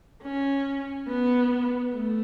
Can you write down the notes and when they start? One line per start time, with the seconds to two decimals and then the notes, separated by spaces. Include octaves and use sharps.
0.23 C#4
1.07 B3
1.93 A3